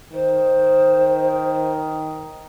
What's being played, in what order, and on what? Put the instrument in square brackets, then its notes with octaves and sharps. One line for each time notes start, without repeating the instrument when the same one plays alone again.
[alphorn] D#3 [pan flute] C5